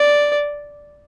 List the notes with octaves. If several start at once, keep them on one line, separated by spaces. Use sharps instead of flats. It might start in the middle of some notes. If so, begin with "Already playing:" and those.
Already playing: D5